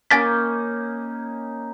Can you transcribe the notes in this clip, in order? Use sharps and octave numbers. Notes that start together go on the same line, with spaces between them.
A#3 C#4 D#4 G#5 A6 B6